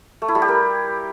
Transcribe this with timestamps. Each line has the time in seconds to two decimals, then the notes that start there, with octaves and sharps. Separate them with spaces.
0.22 A3
0.28 E4
0.35 G3
0.42 G4
0.48 A#4